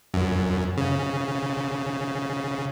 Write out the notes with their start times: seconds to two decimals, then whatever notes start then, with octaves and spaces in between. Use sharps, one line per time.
0.14 F#2
0.77 C#3